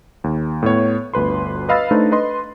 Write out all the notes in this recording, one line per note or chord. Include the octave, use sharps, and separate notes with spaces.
D#2
A2 B3 C#5
G1 D2 B4 C6
B4 D#5 F5 B5 E6 A6
A3 D4 D#4 B4 C5
B4 D#5 C6